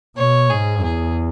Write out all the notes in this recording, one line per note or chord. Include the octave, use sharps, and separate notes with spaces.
B2 C#5
G#2 G#4
E2 G#4